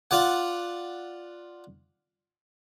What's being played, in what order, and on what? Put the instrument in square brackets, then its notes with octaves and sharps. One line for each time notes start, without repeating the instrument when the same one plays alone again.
[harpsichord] F4 D5 F#5